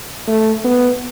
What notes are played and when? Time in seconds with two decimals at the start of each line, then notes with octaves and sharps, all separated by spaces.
0.28 A3
0.64 B3